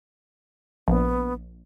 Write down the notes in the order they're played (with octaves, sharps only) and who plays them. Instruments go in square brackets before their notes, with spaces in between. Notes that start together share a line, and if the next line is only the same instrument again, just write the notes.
[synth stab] A#1 [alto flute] B3